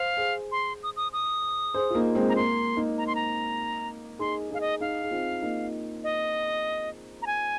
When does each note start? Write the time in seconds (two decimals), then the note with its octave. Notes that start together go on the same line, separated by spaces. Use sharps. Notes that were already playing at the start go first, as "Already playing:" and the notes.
Already playing: C5 F5
0.17 G#4 C5
0.52 C6
0.83 D#6
0.96 D#6
1.13 D#6
1.74 G#4 C5
1.91 F4
1.95 A#3 D#4
2.15 G#3 C4
2.29 A#5
2.36 A#3 C6
2.77 A#3 D#4
2.98 A#5
3.07 C6
3.15 A#5
4.19 D#4 G#4 C6
4.50 D#4 G#4 F5
4.61 D#5
4.81 D#4 G#4 F5
5.03 G#4
5.11 C4 F4
5.42 A#3 D#4
6.04 D#5
7.22 A#5
7.27 G#5